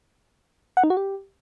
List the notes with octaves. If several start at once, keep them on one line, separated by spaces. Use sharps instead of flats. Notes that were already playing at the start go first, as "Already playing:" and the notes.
F#5
D#4
F#4
G4